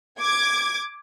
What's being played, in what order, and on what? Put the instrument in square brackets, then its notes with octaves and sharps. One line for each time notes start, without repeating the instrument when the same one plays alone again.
[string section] D6 G#6